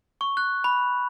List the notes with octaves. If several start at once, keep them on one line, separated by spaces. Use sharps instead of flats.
C#6
F#6
B5